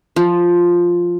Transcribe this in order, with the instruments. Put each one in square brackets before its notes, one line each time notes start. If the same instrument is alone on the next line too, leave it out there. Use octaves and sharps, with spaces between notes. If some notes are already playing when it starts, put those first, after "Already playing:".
[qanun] F3